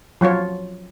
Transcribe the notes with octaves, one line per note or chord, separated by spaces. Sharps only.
F3 F#3 F4 C#5